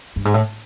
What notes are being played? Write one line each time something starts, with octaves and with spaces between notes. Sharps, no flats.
G2
G#2
A2